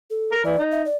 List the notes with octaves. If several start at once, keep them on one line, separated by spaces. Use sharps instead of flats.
A4
A#4
E3 D5
D#4
E5
D5